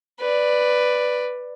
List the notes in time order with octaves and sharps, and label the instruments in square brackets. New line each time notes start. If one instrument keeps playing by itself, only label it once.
[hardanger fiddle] B4 D5